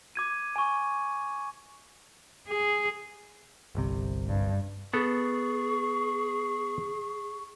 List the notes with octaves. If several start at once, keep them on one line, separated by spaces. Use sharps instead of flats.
D6 G#6 D#7
G#5 C#6
G#4
G1 C2 C3
G2
B3 G#4 A4 C#6